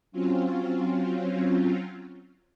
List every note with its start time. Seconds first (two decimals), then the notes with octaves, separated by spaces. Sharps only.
0.12 F#3 C4 C#4 F4